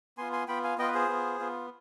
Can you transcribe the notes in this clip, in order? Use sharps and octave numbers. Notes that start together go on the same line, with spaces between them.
B3 F4 G#5 C6
G#5 C6
B3 F4 G5 B5
F5 G#5
B3 F4 D#5 G5
B4
G#4 C5
B3 F4
B3 F4